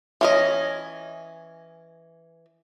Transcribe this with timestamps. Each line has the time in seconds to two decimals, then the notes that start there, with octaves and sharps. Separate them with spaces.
0.21 E3 C#4 D#5